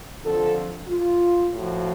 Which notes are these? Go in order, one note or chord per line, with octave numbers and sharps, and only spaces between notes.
F2 D3 F3 A4
F4
A2 F3 F#4